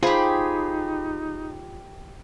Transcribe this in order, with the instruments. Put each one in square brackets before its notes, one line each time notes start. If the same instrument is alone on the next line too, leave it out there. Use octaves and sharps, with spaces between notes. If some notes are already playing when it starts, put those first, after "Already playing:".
[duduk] D#4 [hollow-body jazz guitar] F4 [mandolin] G4 B5 [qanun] G#4 C5